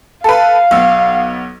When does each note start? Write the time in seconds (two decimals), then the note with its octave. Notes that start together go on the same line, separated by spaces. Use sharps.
0.24 A4 B4 F5
0.71 B1 B3 E6